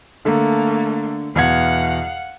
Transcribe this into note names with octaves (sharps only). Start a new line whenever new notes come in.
D3 A3 A#3 A4
E2 B2 F5 F#5 G#6